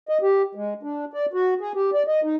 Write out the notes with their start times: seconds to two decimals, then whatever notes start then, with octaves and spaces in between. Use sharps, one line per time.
0.09 D#5
0.22 G4
0.55 G#3
0.83 D4
1.13 D5
1.33 F#4
1.61 G#4
1.75 G4
1.94 D5
2.07 D#5
2.23 D#4